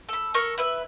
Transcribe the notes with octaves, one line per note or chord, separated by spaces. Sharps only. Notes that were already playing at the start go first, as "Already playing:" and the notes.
A4 B5
A4 A#4 C#6
E4 B4 E5